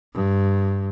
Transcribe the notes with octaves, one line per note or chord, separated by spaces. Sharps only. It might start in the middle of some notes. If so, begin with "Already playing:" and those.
G2